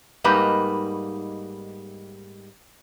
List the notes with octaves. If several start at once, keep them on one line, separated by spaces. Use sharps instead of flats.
G#2 G3 A#3 D#4 B4